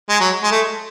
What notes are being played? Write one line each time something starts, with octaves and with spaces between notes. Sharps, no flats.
G#3
F#3
G#3
A3